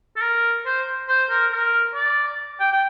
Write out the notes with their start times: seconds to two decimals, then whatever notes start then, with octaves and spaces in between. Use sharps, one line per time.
0.16 A4
0.21 A#4
0.66 C5
1.08 C5
1.30 A#4
1.52 A#4
1.95 D5
2.60 G5
2.72 G5